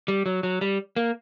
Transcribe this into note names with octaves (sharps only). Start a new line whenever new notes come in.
G3
F#3
F#3
G3
A#3